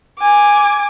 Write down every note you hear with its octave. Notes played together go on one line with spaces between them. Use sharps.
G#5 D6